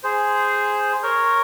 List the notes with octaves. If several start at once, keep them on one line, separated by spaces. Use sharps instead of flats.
G#4 C5
A#4 C#5